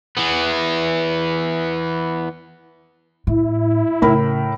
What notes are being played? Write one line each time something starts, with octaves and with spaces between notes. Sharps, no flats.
E3 B3
A2 E4
A2 C#3 A#4 B5